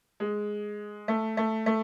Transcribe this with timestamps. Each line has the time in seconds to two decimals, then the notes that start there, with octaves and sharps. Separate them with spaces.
0.20 G#3
1.08 A3
1.37 A3
1.66 A3